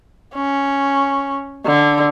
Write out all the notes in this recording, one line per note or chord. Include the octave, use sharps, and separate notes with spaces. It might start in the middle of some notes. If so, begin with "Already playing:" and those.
C#4
D3